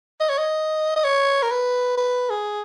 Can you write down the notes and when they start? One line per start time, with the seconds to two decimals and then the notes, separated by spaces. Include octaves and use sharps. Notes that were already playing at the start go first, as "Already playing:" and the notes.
0.20 D#5
0.29 C#5
0.38 D#5
0.96 D#5
1.04 C#5
1.43 A#4
1.51 B4
1.98 B4
2.30 G#4